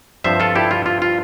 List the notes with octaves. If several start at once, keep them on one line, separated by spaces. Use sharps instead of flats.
G2 F3 C4 C5 E5
F4 A4
E4 G4
F4
F4
F4